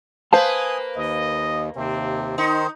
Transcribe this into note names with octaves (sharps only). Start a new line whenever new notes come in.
A#3 B4 C5 F5 G#5 A5 D#6
D#2 D#5
D#2 C3 C4
D#3 D#4 C5